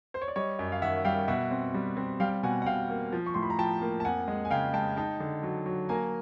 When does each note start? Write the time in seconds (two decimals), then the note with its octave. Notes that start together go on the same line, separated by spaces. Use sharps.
0.14 C5
0.21 C#5
0.28 D5
0.36 G3 C#5 D#5
0.59 F#2
0.72 F5
0.81 D#3 E5 F#5
1.05 G3 F5 G5
1.28 B2 E5 F#5
1.51 C4
1.74 G3
1.97 C4
2.20 G3 F5 G5
2.43 B2 F#5 G#5
2.62 F#5
2.66 B2 F5 G5
2.90 A#3
3.12 F3
3.26 C#6
3.34 A2 C6
3.43 B5
3.50 A#5
3.58 F3 G5 A5
3.82 A#3
4.00 A5
4.04 F2 F#5 G#5
4.28 G#3
4.45 G#5
4.51 C#3 F5 G5
4.73 G#3 G5 A5
4.97 D#4 G5 A5
5.20 D3
5.43 F#3
5.66 F#3
5.89 A#3 G#5 A#5